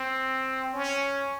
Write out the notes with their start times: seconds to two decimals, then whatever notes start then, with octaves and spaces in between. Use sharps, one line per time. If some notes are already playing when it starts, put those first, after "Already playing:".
Already playing: C4
0.73 C#4